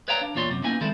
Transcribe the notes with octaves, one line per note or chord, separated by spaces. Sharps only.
B4 C#5 D5 F5 G5 A#5
D4
E2 A#2 F4 C#5 D5 C6
F#2 C3
A#3 B3 C#4 D#4 E4 G#5
D#3 G3 G#3 C4 E4 A4